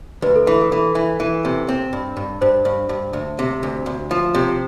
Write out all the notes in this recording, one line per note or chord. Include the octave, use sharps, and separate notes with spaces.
D2 B4
A4
E3
A4
E3
E3
E3
C3
C4
G2
G2
G2 C5
G2
G2
D2
C3
D2
D2
F3
C3